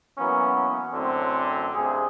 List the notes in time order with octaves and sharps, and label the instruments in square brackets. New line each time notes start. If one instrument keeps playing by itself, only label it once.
[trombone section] E3 F#3 A#3 B3 C#4
F#2 A2 D3 C4
G2 C3 G#4